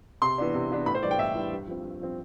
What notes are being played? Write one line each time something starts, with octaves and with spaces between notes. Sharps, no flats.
C3 C6
E3 B3 D4
C3
E3 B3 D4
A2 B5
C5
E3 G3 D4 D5
G5
A2 E5
E3 G3 D4
G2
F3 C4
G2
F3 C4